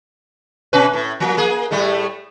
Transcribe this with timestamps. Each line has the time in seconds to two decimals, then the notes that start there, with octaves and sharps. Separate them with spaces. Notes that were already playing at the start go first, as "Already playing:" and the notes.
0.73 B2 C#4 B4
0.93 A2
1.20 F3 A#3
1.37 A#3 G#4
1.71 A2 G3 A3